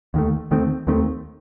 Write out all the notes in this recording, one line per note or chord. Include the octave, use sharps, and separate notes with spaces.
D#2 D#3 A3
D#2 D#3 A3 C4
D#2 D#3 A3 C4